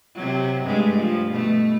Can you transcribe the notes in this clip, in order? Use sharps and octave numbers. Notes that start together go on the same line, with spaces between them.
C3 F#3
G2 G#3 A3
F3
B2 A3